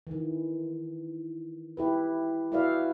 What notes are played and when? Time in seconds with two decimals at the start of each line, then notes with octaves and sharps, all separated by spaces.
0.07 D#3 E3
1.77 E4 G4 B4
2.52 E4 F#4 B4 D5 E5 F5